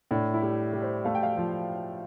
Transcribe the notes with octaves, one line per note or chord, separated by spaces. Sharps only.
A2 D4
E4
G3
G3
C5
A3 F5
G5
F5
F3